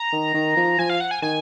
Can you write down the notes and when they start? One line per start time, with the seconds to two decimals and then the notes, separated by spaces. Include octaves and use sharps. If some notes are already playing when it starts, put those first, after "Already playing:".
Already playing: A#5
0.12 D#3
0.34 D#3
0.56 F3
0.79 F3 G#5
0.90 F5
1.00 F#5
1.11 G#5
1.22 D#3 G#5